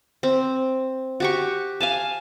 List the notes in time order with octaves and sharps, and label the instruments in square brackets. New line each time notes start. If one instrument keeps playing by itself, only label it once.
[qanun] C4
F#4 G4 C#6
F5 G#5 A5